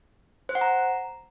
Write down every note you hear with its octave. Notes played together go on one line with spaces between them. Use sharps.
C5
F#5
A#5